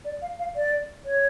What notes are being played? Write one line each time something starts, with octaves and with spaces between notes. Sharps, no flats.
D5
F5
F5
D5
C#5